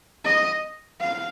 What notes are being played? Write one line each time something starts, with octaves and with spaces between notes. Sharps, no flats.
D#5
F5